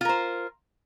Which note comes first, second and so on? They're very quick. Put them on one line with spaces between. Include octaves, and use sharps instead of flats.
F4 A#4 C5